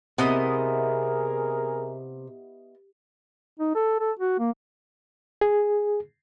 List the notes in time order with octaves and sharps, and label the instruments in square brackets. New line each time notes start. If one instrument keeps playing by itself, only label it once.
[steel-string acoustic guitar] C3 [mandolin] B3 E4 D#5 [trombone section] G#4 A#4
[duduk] D#4
A4
A4
F#4
A#3
[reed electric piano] G#4